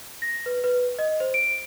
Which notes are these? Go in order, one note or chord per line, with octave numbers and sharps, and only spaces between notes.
A#6
B4
B4
D#5
C5
D7